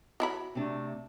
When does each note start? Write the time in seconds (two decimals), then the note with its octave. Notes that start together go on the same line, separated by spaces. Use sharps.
0.20 F#3 E4 B5
0.55 C3 A3 D4